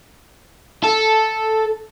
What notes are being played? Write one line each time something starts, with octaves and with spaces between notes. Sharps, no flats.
A4